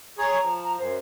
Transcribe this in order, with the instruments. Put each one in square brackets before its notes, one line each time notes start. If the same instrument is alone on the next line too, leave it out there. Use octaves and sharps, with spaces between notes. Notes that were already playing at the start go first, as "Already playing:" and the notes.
[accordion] G#4 C#5 [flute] A#5
[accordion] F3
[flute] A#5
[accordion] F#2 [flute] C5